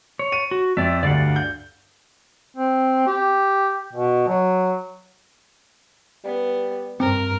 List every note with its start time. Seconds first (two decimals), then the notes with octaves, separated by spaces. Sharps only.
0.19 C#5
0.32 D#7
0.51 F#4
0.77 F2 D5 E5
1.03 D2 G2 D5 F5 F#5
1.36 G6
2.57 C4
3.07 G4
3.93 B2
4.28 F#3
6.24 G3 B3
7.00 G2 C4 A#4